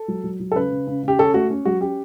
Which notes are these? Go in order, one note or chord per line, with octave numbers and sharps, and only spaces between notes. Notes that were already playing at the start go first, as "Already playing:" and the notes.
Already playing: A4
F#3
F#3
F#3
A4
C#3 B4
C#3
C#3
C#3 G4
C#4 A4
A3 F#4
C#4
F#3 F#4
C#4 G4